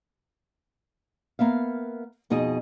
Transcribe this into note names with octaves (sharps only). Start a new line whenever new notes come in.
A#3 B3 E5 F5
F2 B2 D#4 G#4 D#5